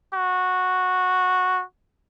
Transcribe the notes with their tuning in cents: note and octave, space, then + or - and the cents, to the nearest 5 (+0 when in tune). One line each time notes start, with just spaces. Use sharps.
F#4 -10